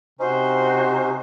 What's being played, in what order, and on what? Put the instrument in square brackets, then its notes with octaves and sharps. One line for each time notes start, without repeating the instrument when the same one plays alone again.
[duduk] C3 [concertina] C#4 D#4 [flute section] F#4 C5